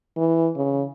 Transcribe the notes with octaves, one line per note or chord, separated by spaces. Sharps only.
E3
C#3